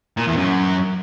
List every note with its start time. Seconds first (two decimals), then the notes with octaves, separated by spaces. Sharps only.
0.17 A#2
0.27 E2
0.37 F#2